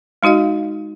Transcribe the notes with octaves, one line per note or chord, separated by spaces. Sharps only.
G#3 D#4 F#4 D#5 F5